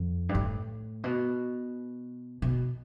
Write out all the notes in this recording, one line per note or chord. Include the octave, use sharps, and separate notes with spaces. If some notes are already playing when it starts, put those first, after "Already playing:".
Already playing: F2
G2
A2
B2
B2